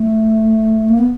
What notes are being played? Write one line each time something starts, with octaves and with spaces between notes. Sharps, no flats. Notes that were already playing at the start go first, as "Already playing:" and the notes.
Already playing: A3
A#3
B3